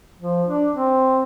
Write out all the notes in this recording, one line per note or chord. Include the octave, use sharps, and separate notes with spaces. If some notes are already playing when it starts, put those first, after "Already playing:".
F3
D4
C4